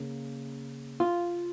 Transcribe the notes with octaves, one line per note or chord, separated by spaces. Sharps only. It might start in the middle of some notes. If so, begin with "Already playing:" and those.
Already playing: C#3 A#3
F4